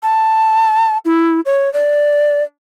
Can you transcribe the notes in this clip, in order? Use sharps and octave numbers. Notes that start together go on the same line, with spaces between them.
A5
E4
C#5
D5